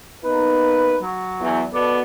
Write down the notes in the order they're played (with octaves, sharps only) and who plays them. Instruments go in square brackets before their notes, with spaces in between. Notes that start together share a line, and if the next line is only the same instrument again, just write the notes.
[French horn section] A#3 B3 D#4 [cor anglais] B4
[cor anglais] F#3
[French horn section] E2
[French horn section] B2 B3 A4 [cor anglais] D5